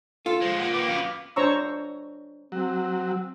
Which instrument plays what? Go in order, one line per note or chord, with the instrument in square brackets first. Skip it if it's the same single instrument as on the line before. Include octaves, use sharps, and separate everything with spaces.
[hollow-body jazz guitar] F4 [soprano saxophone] A4
[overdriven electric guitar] F3 G#3 [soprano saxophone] C5
[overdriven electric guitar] A#2 A#3 [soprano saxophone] F#5
[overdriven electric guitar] D#3 A#3 [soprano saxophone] B4 [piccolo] D6
[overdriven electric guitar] F#2 B3 [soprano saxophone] F5
[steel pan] D4 C5 C#5 A#5 C#6 E6
[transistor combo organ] F#3 [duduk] C4